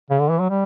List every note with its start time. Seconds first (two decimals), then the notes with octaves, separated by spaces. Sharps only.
0.11 C#3
0.20 D3
0.30 E3
0.40 F#3
0.50 G3